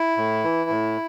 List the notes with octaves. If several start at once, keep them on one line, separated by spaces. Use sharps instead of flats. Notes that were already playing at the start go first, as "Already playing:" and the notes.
Already playing: E4
A2
E3
A2